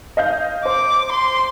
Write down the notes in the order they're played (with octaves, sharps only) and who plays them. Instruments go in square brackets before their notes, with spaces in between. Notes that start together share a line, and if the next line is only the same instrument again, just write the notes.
[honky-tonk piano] D#5 F5 G6
[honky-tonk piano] C5 [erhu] D6
[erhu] C6